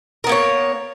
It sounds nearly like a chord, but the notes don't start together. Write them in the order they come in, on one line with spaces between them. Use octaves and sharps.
A#4 B3 A#3 C#5